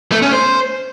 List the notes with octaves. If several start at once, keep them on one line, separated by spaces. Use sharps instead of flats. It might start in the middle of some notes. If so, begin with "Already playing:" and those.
A3
C#4
C5